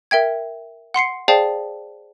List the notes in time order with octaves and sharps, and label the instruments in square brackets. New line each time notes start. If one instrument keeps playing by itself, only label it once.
[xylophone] A#4 E5 G5 G#6
F#5 C6 C7 C#7
G#4 C5 D5 F5 G5 A5